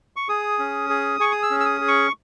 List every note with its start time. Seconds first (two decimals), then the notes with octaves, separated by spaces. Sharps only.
0.16 C#6
0.29 G#4 D#6
0.59 C#4
0.90 G#4
1.20 G#4 C#6
1.32 D#6
1.43 E6
1.50 C#4
1.60 E6
1.65 D#6
1.81 G#4
1.88 C#6